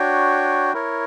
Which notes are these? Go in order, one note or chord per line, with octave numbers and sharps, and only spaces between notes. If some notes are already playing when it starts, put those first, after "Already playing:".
Already playing: D4 F#4 C#5 G5
E4 A#4 C#5